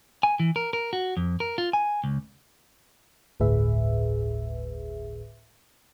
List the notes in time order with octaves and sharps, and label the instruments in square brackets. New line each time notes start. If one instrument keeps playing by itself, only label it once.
[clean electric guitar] G#5
E3
A#4
A#4
F#4
F2
A#4
F4
G#5
C#2
[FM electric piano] G1 D2 A2 G#4 B4 E5